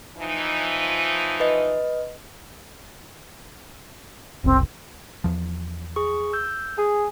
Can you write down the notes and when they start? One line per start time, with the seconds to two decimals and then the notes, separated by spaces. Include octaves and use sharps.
0.18 E3 F3 D#4
1.40 B4 D#5
4.44 F#1 C2 C4
5.24 E2 F3
5.96 G#4 C#6
6.33 E6 G6
6.78 G#4 G#5